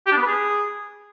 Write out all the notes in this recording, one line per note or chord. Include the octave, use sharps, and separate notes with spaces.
G4
D4
B3
B4
G#4